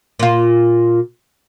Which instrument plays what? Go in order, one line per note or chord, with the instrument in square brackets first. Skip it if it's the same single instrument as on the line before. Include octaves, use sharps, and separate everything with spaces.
[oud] A#2 F4